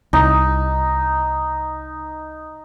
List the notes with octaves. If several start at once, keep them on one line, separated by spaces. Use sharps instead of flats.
C2 D#4